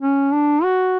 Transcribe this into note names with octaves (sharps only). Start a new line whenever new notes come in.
C#4
D4
F#4